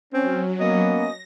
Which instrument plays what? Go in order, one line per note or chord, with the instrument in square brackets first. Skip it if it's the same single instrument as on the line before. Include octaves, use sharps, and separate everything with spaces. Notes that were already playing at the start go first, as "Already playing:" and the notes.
[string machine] F#3 [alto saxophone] C4 [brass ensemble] C#4
[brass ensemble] A#3 B3 C#4 [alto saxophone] D#5
[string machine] A#6